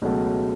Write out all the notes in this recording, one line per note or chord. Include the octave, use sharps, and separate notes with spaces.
C#2 B2 F#3 A3